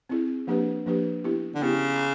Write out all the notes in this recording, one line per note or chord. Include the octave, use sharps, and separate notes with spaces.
C4 E4 G#4
F3 A#3 D4 G4 B4
F3 A#3 D4 G4 B4
B3 E4 G4
D3
C#3 B3 E4 G4